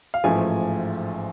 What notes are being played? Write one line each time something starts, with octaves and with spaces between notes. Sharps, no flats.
F5
A1 G#2 F3 A3 G#5